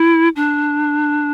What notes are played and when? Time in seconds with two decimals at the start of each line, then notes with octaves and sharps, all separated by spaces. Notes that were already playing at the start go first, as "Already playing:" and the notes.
Already playing: E4
0.36 D4